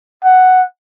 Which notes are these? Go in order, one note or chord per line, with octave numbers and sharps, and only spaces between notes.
F#5